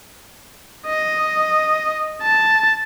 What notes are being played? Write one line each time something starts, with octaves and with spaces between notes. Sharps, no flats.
D#5
A5